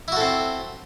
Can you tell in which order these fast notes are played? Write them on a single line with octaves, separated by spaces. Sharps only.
E4 F#4 A4 C4